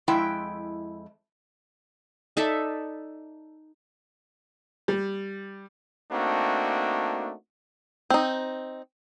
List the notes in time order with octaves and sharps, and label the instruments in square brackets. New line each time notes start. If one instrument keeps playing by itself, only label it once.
[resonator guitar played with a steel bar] F2 G#3 E4 E5 G5
[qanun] D#4 A4 D5 E5
[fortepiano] G3
[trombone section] A3 A#3 C4 D4 D#4 F#4
[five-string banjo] C4 D#4